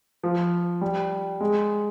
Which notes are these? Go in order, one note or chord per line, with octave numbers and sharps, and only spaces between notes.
F3
G3
G#3